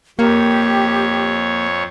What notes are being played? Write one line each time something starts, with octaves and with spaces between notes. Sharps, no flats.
F2 A#3 G4 C#5